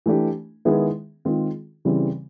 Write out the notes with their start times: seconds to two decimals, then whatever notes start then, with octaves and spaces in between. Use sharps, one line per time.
0.06 E3 A3 D4 G4
0.65 D#3 G#3 B3 E4 G#4
1.25 D#3 G#3 C4 F4 G#4
1.85 C#3 E3 G3 C4